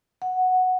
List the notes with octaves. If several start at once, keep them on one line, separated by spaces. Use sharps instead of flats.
F#5